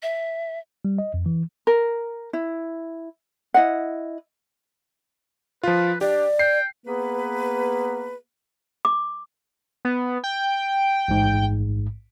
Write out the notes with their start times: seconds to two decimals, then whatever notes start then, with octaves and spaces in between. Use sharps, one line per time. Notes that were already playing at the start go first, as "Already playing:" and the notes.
0.03 E5
0.85 G3
0.98 D#5
1.14 F2
1.26 E3
1.67 A#4
2.33 E4
3.54 E4 D#5 F#5
5.63 F3 F4 B4
6.01 D4 G4 D5
6.39 G5 C7
6.86 A#3 B3 G#4 B4
8.85 D6
9.85 B3
10.24 G5
11.08 A1 G#2